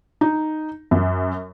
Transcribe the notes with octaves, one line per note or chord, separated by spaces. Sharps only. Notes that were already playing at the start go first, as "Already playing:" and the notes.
D#4
F#2